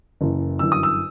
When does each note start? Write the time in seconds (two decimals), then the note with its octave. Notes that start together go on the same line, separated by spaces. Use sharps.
0.21 F#1 F#2 E3
0.59 G1 F#2 E3 E6
0.72 D#6
0.83 E6